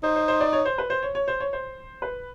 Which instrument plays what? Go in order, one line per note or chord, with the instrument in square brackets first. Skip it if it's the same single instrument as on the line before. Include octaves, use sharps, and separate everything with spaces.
[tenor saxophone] D#4 [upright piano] C5
[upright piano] C5
C5
D5
C#5
C5
B4
C5
C#5
C#5
C5
C#5
C5
B4